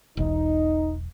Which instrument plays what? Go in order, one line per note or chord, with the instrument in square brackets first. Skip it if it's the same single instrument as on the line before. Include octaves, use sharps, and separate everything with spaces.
[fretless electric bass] E1 B1 E2 [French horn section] D#4